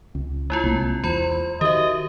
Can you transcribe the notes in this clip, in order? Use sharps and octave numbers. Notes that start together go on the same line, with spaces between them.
C#2
G#3 E4 F4
C2 A#3
E2 F4 C5 B5
D#3 F#4 G4 D#5 E5